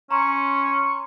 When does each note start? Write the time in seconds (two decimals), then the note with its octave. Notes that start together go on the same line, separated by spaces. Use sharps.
0.11 C#4 A#5 C6 C#6